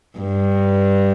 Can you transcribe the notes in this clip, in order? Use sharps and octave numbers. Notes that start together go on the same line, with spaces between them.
G2